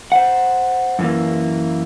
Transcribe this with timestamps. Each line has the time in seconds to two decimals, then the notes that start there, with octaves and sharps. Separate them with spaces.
0.12 C5 F#5
0.99 F#2 E3 A#3